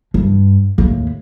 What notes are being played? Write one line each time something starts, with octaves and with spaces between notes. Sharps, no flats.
G2
D#2 A2